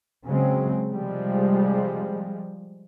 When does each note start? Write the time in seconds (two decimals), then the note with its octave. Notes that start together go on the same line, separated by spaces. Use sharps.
0.26 C#3 F#3 G#3 C4
0.91 C3 F3 G3 G#3